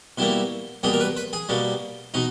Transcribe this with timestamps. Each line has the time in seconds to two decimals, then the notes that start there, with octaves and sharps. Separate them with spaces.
0.18 B2 G3 A#3 E4
0.83 B2 G3 A#3 G#4
0.93 A#4
1.00 B4
1.17 B4
1.33 G#4
1.49 B2 G3 A#3
2.14 B2 D#4